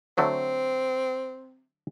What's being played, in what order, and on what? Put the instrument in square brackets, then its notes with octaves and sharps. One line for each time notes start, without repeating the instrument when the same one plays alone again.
[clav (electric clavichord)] D3 F#3 A3 [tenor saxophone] C4